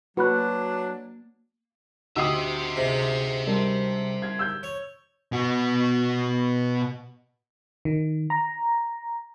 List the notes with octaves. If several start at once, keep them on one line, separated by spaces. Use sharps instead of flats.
F#3 A#3 D4 F#4 B4 B5 F#6
D2 G4 C5 D#5 E5 F#5 D#6 E6
G#2 C3
G3 D4 A#4
G#6
E6 G6
C#5
B2 F#4
D#3
A#5